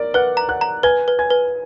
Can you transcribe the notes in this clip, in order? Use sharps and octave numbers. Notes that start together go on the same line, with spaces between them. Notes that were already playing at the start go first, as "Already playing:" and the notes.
Already playing: A#4 D5 D6
B4 F#5 F#6
A#5
F#5 F#6
A#5
B4 G#5 G#6
B4
G#5 G#6
B4